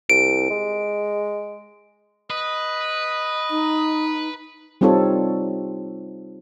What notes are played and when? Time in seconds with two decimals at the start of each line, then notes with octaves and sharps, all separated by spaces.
0.10 C2 D7
0.50 G#3
2.30 B4 D#5
3.51 D#4
4.81 G3 C4 D#4 F4 A4 C#5